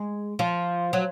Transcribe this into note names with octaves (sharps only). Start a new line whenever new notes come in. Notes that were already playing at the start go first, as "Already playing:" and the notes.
Already playing: G#3
F3
F#3